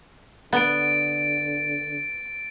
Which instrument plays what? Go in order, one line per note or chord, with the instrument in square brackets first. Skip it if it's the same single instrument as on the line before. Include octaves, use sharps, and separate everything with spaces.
[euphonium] D3 [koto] B3 [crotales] A6 D7